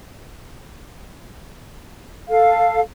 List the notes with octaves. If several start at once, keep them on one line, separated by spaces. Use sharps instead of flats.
A4 F5